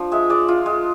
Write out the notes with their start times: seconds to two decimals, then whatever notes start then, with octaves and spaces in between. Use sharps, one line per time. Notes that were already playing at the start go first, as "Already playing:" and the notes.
Already playing: F3 D4
0.12 G#3 E5
0.30 G#3 D5
0.48 F4
0.66 G#3